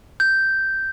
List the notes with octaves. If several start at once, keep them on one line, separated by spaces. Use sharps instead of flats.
G6